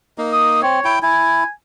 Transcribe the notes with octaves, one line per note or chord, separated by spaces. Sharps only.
A#3 D#4
D#6
C4 C#5
E4 G5
E4 G#5